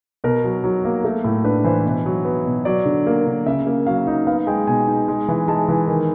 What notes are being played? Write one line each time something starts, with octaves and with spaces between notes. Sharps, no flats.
B2 A#4
F#3
F#3
A#3
A3
A2
D4 B4
E3 C5
B2
F#3
B3
B2
F#3 D5
D3
A#3
D3
C#3 E5
A#3
F#3 F5
D#4
B3 F5
G#3 G5
B2 G#5
D#4
G#3
E3
G#3 A5
E3
D#3